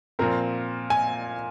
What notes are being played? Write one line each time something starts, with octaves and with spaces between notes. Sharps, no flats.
A#2 F3 C4 A#4
G#5